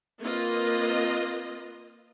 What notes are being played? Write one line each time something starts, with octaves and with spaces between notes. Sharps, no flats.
A#3 C4 F4 B4 D#5